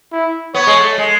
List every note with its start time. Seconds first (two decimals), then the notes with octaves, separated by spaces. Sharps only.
0.12 E4
0.54 B3 C#5
0.67 G#3
0.76 A3
0.98 G#3